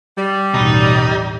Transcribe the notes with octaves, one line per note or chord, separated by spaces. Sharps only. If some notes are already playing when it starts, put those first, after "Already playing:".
G3
A1 D#2 B2 D#4